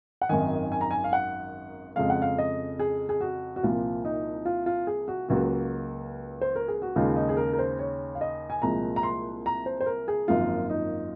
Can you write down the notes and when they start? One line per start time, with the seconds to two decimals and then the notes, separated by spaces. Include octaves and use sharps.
0.22 F#5
0.29 G#1 F#2 D#3 G#5
0.72 G#5
0.81 A#5
0.91 G#5
1.04 F5
1.13 F#5
1.96 F2 C#3 G#3 F5
2.10 F#5
2.22 F5
2.38 D#5
2.79 G#4
3.09 G#4
3.21 F#4
3.56 F#4
3.63 C2 A#2 F3 A#3 F4
4.05 D#4
4.45 F4
4.66 F4
4.87 G#4
5.08 F#4
5.29 C#2 C#3 F#3 A#3 F#4
6.41 C5
6.56 A#4
6.68 G#4
6.82 F#4
6.96 D#2 C#3 G#3 F4
7.16 D#4
7.29 G#4
7.37 A#4
7.53 A#4
7.59 C5
7.79 C#5
8.15 F5
8.21 D#5
8.50 G#5
8.62 C2 A#2 F3 G#3 A#5
8.96 A#5
9.03 C6
9.46 A#5
9.66 C5
9.80 C5
9.86 A#4
10.08 G#4
10.28 G#1 F#2 F3 A#3 F4
10.70 D#4